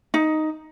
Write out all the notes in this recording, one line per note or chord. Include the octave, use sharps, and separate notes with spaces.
D#4